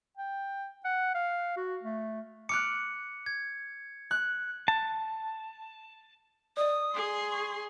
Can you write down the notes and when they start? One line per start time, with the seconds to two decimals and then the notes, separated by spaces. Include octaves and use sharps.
0.17 G5
0.85 F#5
1.15 F5
1.57 F#4
1.83 A3
2.49 D6 F6 F#6 C#7
3.26 G#6
4.11 F#6
4.68 A5
6.57 D5 D#5 D#6
6.93 G#4 C6
7.31 C#6